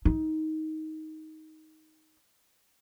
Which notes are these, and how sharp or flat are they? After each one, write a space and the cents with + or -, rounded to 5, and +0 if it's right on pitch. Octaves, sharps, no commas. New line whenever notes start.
D#4 +15